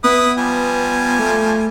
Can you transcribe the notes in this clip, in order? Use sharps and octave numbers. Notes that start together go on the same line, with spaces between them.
B3 E4 B4 D#6
F3 G3 G#5
A3